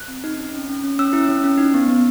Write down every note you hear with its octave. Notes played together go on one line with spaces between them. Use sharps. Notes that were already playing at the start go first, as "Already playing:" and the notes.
Already playing: F#6
C4
D#4
C#4
C#4
C#4
C#4
C#4 E6
E4
C#4
C#4
D#4
B3
B3